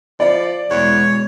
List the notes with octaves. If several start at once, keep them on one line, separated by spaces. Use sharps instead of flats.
F3 D5
E2 B2 G#3 C#5